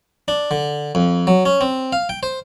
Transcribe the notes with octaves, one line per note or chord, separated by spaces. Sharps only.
D4
D3
F2
F#3
C#4
C4
F5
G5
C5